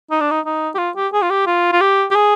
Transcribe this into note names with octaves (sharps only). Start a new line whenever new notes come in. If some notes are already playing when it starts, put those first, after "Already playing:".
D#4
D4
D#4
D#4
G4
F4
G4
G#4
F4
G4
F4
F4
G4
G4
G#4